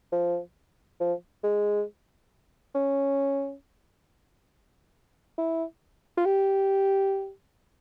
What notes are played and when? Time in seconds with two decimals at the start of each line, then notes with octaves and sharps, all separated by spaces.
0.12 F3
1.00 F3
1.43 G#3
2.75 C#4
5.38 E4
6.17 F4
6.25 G4